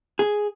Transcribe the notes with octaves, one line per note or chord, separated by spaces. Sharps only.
G#4